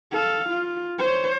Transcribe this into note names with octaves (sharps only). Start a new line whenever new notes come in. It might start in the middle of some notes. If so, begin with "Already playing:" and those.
A4 F5
F4
C5 C#5